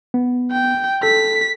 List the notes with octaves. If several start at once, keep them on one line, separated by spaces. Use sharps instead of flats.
B3
G5
A4 B6